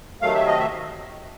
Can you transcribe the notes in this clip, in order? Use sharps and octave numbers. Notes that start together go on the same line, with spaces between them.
C3 D#3 F#3 A3 F5
E5
D#5
E5